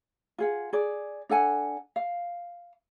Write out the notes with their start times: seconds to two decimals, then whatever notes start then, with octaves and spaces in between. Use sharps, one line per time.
0.38 F4 G#4 F#5
0.73 G#4 D5
1.29 D4 A4 F#5 G#5
1.96 F5